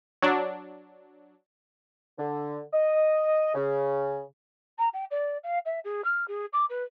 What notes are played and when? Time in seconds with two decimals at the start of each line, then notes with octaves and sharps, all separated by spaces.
0.22 F#3 D4
2.19 D3
2.73 D#5
3.55 C#3
4.78 A#5
4.93 G5
5.11 D5
5.43 F5
5.65 E5
5.84 G#4
6.04 F6
6.28 G#4
6.53 D6
6.69 B4